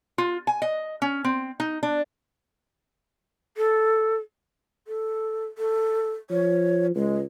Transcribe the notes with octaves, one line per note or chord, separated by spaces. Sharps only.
F4
G#5
D#5
C#4
C4
D#4
D4
A4
A4
A4
F3 C#5
C#2 G#3